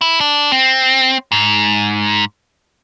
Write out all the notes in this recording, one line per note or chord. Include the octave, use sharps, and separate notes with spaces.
E4
D4
C4
G#2